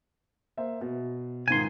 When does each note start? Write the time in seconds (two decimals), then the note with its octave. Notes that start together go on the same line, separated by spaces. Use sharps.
0.57 A#3 C5 E5
0.81 B2
1.48 C#2 G#2 D#3 G#5 C6